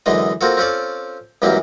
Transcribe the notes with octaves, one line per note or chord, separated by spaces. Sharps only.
F#2 D3 E3 G#3 D#5
A#3 C4 F4 F#4 A4
C4 C#4 F4 A4 D5
C#2 F#2 E3 F#3 G3 A#3